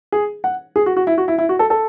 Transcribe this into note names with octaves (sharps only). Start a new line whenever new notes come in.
G#4
F#5
G#4
F#4
F#4
E4
F#4
E4
E4
F#4
A4
A4